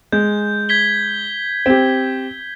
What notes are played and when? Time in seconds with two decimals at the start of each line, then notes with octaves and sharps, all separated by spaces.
0.12 G#3 G6
0.69 G#6 B6 G7
1.66 C4 G4